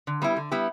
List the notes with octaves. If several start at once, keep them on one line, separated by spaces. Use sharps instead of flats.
D3
G3 B3 E4 G4
D3
G3 B3 E4 G4